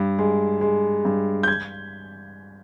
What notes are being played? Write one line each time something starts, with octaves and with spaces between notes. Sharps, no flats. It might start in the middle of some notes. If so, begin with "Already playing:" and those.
Already playing: G2
G#3
G#3
G2
G6
G#6